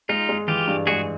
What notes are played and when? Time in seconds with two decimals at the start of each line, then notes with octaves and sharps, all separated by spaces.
0.09 G#3 D#4 F4
0.29 G#3
0.48 E3 F4 G4
0.67 G2
0.87 G#3 F#4 G#4